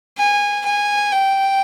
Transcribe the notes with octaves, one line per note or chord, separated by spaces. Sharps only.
G#5
G#5
G5